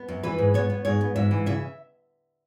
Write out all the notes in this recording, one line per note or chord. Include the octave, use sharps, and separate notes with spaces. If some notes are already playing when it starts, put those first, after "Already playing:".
Already playing: B3
F#2
E3 B4
G#2
B3 C#5
B3
G#2 C#5
B3
G#2 E5
E3
C#3 E5